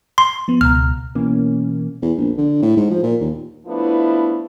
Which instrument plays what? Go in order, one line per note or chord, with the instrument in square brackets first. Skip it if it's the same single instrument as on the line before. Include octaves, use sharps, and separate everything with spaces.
[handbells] C6
[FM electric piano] F3 B3
[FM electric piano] C#2 B2 A#5 [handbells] F6
[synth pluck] B2 E3 A#3 C#4
[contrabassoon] E2
A#1
D3
A2
G#2
F3
A#2
D#2
[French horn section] F3 A3 B3 D4 E4